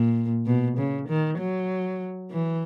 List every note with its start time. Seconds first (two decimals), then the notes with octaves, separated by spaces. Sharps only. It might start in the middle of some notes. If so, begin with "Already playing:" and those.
Already playing: A#2
0.46 B2
0.78 C#3
1.09 D#3
1.38 F#3
2.31 E3